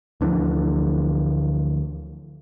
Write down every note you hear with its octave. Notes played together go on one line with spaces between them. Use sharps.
D2 D3 E3 F3